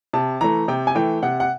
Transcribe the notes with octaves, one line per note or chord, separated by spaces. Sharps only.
C3 A5
E3 A3 A#5
C3 G5
G#5
E3 A3 G5
C3 F#5
F#5